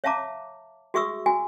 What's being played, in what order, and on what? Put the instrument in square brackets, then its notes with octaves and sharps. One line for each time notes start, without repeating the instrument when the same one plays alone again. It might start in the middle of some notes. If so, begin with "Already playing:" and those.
[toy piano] C#5 E5 F5 A5 A#5 D6
F#4 G#4 E5 C#6 D#6 E6
F#4 G#5